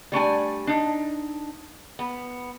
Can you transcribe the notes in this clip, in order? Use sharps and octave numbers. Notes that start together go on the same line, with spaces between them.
G3 A3 D4 G#5
D4 D#4
B3